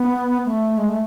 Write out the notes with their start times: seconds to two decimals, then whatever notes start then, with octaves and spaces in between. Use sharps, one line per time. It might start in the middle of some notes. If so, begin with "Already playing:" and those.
Already playing: B3
0.45 A3
0.77 G#3
0.89 A3